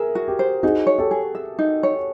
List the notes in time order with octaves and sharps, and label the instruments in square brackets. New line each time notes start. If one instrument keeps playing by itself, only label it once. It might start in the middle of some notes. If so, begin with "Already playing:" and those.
Already playing: [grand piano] G#4 A#4 [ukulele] E5
[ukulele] F#4
[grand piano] G4
[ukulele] C5
[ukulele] D#4 [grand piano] F#4 G#4
[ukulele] C#5
[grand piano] G4 A4
[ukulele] G#4
E5
D#4
C#5